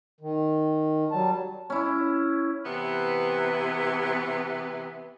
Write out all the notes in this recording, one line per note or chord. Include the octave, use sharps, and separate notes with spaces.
D#3
F#3 G3 A5
C#4 E4
C3 E3 B3 B4